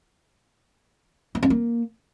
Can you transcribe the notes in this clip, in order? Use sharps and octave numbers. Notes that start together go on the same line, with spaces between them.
B3
C4
A#3